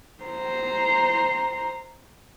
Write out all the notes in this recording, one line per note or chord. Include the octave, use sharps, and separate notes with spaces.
C5 A#5